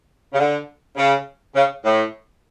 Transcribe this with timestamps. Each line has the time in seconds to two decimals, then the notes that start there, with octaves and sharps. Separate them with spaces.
0.33 C#3
0.39 D3
0.97 C#3
1.55 C#3
1.85 A2